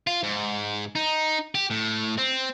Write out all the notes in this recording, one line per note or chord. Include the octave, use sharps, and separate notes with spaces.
F4
G#2
D#4
G4
A2
C4